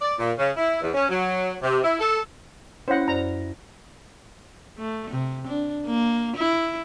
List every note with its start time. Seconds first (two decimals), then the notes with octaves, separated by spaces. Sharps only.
0.02 D5
0.19 A#2
0.38 C#3
0.57 E4
0.81 E2
0.94 C#4
1.09 F#3
1.62 C3
1.84 E4
1.99 A4
2.88 C#4 E4 C5 C#5 F#5 A#6
3.08 F#2 C5 D5 A#5
4.78 A3
5.11 C3
5.47 D4
5.87 A#3
6.36 E4